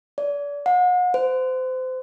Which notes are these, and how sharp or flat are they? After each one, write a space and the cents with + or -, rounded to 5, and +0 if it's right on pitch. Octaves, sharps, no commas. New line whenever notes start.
D5 -35
F#5 -40
C5 -30